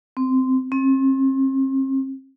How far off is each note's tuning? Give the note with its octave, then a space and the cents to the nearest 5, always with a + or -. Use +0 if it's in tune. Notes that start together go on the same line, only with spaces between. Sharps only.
C4 -15
C4 +40